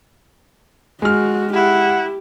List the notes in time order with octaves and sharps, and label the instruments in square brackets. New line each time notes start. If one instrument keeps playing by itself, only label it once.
[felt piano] G#3 F6 [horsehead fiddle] F#4
[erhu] E4 [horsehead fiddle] G4 [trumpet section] F#5